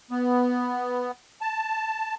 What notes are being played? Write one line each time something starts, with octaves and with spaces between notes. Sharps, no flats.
B3
A5